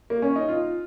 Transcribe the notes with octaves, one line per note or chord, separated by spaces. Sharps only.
A#3
C#4
D#4
F4